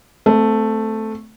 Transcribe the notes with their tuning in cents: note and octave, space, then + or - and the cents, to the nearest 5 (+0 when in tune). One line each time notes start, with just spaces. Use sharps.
A3 +0 C4 -20